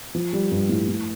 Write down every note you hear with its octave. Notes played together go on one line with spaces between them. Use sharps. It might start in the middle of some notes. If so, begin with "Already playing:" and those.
F3
G3
G2
A2
A2